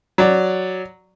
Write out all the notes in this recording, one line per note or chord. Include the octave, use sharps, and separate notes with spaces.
F#3 D5